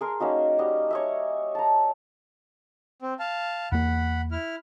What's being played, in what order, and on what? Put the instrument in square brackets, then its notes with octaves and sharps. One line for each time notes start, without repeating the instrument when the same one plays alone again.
[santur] G#4 A#4 C6
A#3 C#4 D#4 F#4
G3 D#5 F#5
C#5 D#5 E5
A5 A#5
[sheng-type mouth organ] C4
F5 A5
[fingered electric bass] E2 A#3 [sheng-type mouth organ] F#5 B5
[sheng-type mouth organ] E4 F6